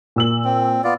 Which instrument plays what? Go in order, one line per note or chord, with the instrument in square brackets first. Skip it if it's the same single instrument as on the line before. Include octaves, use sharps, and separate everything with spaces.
[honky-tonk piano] A#2 E6 F#7
[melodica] C4
B3 F4 D5